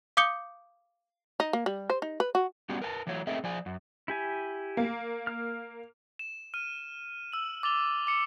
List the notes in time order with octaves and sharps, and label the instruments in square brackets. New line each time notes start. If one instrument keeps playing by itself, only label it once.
[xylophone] F5 D6 D#6 G6 C#7 G7
[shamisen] D#4
A#3
G3
C5
D#4
B4
F#4
[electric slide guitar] G3 B3 C#4 D4 F#4 G4
A#4 B4 G#5 A5
E3 F#3 A3 C#5
A3 C4 G#4 A#4 D#5 E5
F3 D5 G#5
F#2
[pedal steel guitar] E4 G4 G#5
[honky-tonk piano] A#3
[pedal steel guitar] F6
[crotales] E7
F6 D#7
E6 F#7
D6 A6 F7 G7
D6 C#7